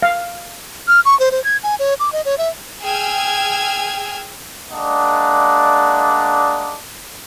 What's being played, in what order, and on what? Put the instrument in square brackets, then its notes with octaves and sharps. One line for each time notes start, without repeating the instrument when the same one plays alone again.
[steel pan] F5
[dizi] F6
C#6
C5
C5
G#6
G#5
C#5
D6
D#5
C#5
E5
[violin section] G#4 G5 E6 F6 G#6
[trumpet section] G#3 A#3 D4 D5 D#5 F#5